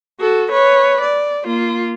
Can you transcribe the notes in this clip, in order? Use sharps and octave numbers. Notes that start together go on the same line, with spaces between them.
F#4 A4
B4 C#5
D5
A#3 F4